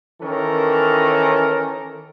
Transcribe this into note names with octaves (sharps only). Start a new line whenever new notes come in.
D#3 E3 C#4 A4 A#4